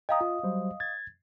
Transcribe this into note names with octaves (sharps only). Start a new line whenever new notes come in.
D#5 F5 G5 A#5 D#6
F4
F#3 G3 C5
G#6 A6